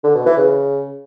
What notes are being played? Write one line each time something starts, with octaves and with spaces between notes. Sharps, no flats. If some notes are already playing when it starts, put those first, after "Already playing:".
D3
B2
E3
C#3